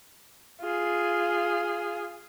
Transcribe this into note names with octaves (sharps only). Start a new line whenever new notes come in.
F4 G#4